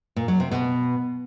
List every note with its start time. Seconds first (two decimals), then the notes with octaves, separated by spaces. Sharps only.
0.16 A#2
0.28 F#3
0.40 C3
0.51 B2